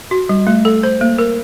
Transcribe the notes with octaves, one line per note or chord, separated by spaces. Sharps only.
F#4
G3
A3
A4
C5
A#3
A#4